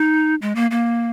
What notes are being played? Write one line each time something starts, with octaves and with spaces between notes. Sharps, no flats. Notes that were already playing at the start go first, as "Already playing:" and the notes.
Already playing: D#4
G#3
A#3
A#3